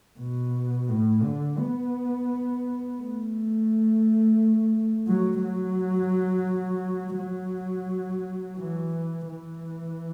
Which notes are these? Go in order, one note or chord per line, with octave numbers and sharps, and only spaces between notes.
B2
A2
D3
B3
A3
F#3
F#3
F#3
E3
E3